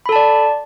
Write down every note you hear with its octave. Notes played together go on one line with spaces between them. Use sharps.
A4 D5 A5 B5